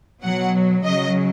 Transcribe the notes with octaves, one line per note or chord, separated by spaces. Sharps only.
B2 F#3 F#5
C#3 F#3 D#5